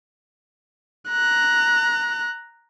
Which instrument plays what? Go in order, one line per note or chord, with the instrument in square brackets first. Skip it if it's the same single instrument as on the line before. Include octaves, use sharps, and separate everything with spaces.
[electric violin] A#5 F#6